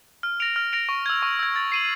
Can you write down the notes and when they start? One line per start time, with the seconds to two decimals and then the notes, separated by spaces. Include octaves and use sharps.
0.23 F6
0.40 A#6 D7 F7
0.56 F6
0.73 A#6 D7 F7
0.89 C#6
1.06 E6 G#6
1.23 C#6
1.39 E6 G#6
1.56 A6
1.72 C7 D#7 F#7